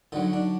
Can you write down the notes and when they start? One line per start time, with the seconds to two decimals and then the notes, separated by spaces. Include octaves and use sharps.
0.12 D3 F#3 D#4
0.33 D4